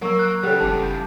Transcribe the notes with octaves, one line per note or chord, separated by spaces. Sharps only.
F#3 A#3 A#4 C#6 E6
F#6
C#3 G3 G4 A4 F#5 G5 F#6
F#1 A5 D6
G6